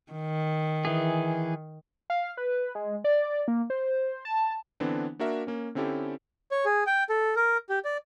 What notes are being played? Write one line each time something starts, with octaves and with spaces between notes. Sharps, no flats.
D#3
E3 G#4
F5
B4
G#3
D5
A#3
C5
A5
D3 E3 B3 C4 D4
A#3 D4 F#4 A#4 E5
A#3 C#4
D3 C4 C#4 E4 G4 A4
C#5
G#4
G5
A4
A#4
G4
D5